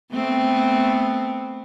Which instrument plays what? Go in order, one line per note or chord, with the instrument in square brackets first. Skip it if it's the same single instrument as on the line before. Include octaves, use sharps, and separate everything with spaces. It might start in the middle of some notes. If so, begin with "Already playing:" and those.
[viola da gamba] A3 B3 C4